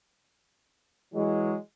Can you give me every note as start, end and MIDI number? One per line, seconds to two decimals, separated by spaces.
1.14 1.55 52
1.14 1.55 54
1.14 1.55 56